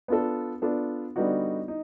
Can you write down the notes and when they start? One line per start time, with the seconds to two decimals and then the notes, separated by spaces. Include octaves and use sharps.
0.08 B3 D4 F4 A4
0.62 B3 D4 F4 A4
1.16 D3 G3 B3 D#4 F#4
1.68 D#4